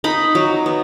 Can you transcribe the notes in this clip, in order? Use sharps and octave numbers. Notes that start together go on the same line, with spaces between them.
D#4 B5
F#3
B3